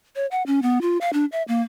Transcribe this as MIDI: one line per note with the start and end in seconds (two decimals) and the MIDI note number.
0.16 0.26 73
0.31 0.43 78
0.47 0.62 61
0.62 0.81 59
0.82 0.98 65
1.01 1.10 77
1.13 1.25 62
1.32 1.43 76
1.48 1.62 58